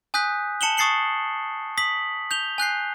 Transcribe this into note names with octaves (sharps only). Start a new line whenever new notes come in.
G#5 D#6 F#6 G6 B6
A5 C#7 E7 F#7 G7
C#6 D#6 A6 C7 C#7 F#7
D#6 B6 F#7
G6 F7 G7
G#5 F#6 G6 C7